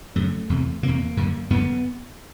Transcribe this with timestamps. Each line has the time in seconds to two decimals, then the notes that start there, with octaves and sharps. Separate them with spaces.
0.16 F#2 C#3 A3
0.50 E2 C3
0.83 E2 C3 A#3
1.17 F#2 D3
1.50 F#2 D3 B3